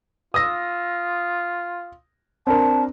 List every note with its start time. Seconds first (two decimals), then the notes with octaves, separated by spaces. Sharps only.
0.34 F4 D#6 E6 A#6
2.47 C4 D4 A#4 A5